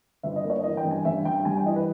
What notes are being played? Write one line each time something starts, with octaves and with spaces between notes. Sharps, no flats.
G1 E5
D#5
A#3
C#5
E3 D#5
G5
G2
G#5
G2 E5
G2 G5
G5
G3 G#5
G5
E3 D#5
B4